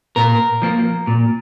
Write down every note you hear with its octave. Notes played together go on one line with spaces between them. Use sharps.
A#2 A#4
F3 A#3
A#2